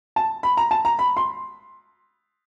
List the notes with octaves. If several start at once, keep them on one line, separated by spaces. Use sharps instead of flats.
A5
B5
A#5
A5
A#5
B5
C6